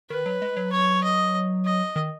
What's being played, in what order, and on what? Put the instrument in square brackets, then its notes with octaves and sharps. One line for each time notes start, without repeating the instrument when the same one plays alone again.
[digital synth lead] D#3 [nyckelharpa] B4
[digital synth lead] F#3
G#3
F#3
[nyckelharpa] C#5
D#5
D#5
[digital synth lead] D#3